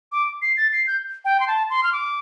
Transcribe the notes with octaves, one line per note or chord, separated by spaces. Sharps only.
D6
C7
A6
C7
G6
G5
C6
A5
C6
F6
D6